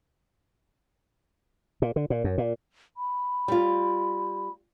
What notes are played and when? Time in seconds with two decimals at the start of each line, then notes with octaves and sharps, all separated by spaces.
1.82 A#2
1.96 D3
2.10 A#2
2.24 F#2
2.38 A#2
2.97 B5
3.48 G3 F4